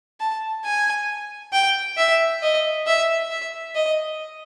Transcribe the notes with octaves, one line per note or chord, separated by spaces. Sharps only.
A5
G#5
G5
E5
D#5
E5
E5
D#5